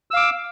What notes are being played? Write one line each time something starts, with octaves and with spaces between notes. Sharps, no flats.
F5 D6 E6